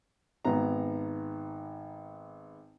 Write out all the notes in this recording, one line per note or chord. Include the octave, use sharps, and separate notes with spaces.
G#1 G#2 B3 A#5